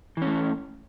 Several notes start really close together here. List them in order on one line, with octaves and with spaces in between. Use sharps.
E3 C#4 A3